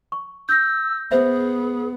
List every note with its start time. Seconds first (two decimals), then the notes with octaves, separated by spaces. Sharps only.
0.12 C#6
0.49 E6 G6 A#6
1.11 B3 G#4 C5 E5